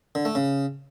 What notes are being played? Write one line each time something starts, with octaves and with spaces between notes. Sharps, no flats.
D3
A3
C#3